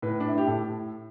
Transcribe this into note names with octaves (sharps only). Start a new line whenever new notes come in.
A2 B4
D4
E4
G4
A2 A4